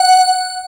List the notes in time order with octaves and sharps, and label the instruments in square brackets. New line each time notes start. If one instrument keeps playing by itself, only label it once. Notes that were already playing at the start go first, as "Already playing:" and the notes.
Already playing: [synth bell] F#5